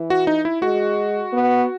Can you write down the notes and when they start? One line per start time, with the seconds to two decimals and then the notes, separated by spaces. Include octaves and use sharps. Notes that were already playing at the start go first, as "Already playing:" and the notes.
Already playing: E3
0.10 F#4
0.27 D#4
0.45 E4
0.62 G#3 F#4
1.33 B3